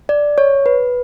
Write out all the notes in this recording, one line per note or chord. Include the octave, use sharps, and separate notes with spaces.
D5
C#5
B4